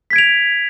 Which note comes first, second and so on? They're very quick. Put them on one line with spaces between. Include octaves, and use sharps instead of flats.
B6 G#6 D7 F7